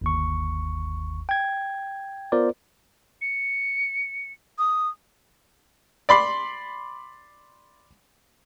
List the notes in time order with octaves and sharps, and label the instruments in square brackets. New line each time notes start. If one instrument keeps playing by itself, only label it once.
[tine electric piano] G1 D#2 C#6
G5 G#6
B3 F4 A#4 C5 D5
[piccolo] C#7
[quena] D#6
[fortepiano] D5 B5 C6